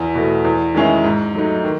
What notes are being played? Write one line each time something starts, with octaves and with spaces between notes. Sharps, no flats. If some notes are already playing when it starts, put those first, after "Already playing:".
Already playing: E2
B2 A3
E2
D#3 G#3 C#4 E4
G#2
F#3 A3 D#4
D#3